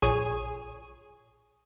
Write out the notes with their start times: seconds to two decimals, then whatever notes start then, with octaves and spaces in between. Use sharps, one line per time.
0.02 A#1 G#4 C#5 D#6